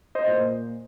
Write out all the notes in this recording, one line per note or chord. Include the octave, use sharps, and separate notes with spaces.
C5 D#5
A#2